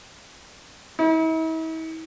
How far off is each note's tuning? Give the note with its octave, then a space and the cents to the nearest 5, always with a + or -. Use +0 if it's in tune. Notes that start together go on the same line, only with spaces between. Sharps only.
E4 -45